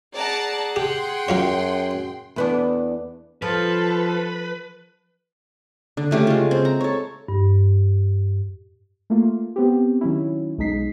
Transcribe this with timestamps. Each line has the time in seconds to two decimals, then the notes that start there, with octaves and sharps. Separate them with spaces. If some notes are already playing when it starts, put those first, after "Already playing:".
0.15 G#4 D5 F#5 A5 A#5
0.76 G4 G5 C6
1.28 F#2 F#3 F4 C#5
2.36 E2 B3 D4
3.42 F3 F4 A4 B4
5.97 D3
6.11 C#3 A3 G4
6.27 G#3 F4
6.51 C4
6.65 A#5
6.81 A4 C#5
7.28 G2
9.10 A3 A#3 F4
9.56 B3 C4 G4
10.01 D#3 F#3 C#4 E4
10.58 B1 G#3 D#4 B6 C7